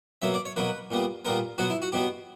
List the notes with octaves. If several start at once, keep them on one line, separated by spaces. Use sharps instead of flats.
B2 F#3 A#3 E5
D5
C#5
B2 F#3 A#3 B4
A#2 G3 B3
A#2 G3 B3 A#4
B2 F#3 B3 F#4
E4
F#4
B2 F#3 B3 G4